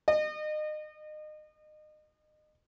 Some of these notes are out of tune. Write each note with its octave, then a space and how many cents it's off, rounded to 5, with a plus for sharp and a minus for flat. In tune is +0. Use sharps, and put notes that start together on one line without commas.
D#5 -30